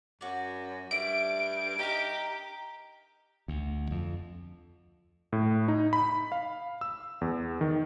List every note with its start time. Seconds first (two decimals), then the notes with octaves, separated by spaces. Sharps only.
0.21 F#2 F#4 D5
0.91 G2 A3 D5 D7
1.79 D#4 G4 A#4
3.48 D2
3.91 F2
5.33 A2
5.68 D#4
5.93 B5
6.32 F5
6.81 E6
7.21 E2
7.61 D#3